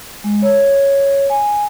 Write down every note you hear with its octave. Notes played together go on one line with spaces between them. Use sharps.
G#3
C#5
G#5